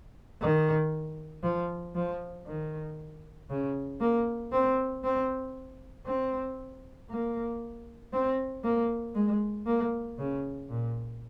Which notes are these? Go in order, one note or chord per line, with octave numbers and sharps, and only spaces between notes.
D#3
F3
F3
D#3
C#3
A#3
C4
C4
C4
A#3
C4
A#3
G#3
A#3
C#3
A#2